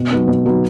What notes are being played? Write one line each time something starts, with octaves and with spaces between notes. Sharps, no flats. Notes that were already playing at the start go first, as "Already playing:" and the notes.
Already playing: B2
F#3 B3 D#4
B2
F#3 B3 D#4